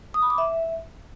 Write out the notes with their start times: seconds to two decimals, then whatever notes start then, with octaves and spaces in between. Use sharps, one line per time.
0.14 D#6
0.22 B5
0.30 D6
0.38 E5